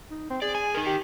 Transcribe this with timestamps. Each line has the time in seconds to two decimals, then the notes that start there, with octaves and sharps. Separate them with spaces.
0.11 D#4
0.30 C4
0.42 G#4 D5
0.55 G#5
0.75 D#4 A#4
0.86 G4